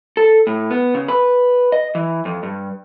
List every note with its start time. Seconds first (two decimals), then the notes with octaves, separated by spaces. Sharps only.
0.17 A4
0.47 A2
0.70 B3
0.95 C#3
1.08 B4
1.72 D#5
1.95 E3
2.25 F2
2.43 G2